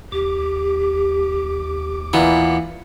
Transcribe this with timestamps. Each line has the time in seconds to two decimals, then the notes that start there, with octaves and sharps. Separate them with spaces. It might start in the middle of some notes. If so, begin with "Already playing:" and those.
0.12 D#2 G4 D6
2.13 A#2 E3 B3